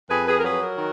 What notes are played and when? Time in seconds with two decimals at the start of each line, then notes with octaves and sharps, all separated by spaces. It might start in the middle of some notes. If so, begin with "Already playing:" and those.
0.10 F2 G#4 B4
0.27 G#4 B4
0.38 A#4
0.43 F#3 G#4 B4
0.59 F#4 A#4
0.76 D#3